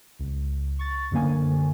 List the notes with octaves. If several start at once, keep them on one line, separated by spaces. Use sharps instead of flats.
C#2
C#6 A6
F#2 D3 A#3 G#5